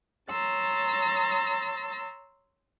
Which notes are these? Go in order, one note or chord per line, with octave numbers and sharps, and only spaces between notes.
C#5 A#5 C6 E6 A6